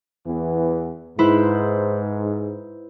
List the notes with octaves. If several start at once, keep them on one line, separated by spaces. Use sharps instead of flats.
E2 E3 B3
G#2 E4 B4 C5